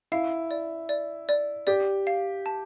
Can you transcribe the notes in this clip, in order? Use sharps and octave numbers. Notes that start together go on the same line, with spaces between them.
E4 F5
D5
D5
D5
G4 D5
F5
A5